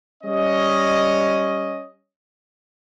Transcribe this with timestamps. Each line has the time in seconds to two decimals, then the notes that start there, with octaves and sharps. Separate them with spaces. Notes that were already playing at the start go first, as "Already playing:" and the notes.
0.23 G3 C#4 D#5